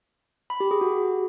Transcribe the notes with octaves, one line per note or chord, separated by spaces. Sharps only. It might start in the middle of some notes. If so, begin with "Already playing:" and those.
B5
G4
G#4
F#4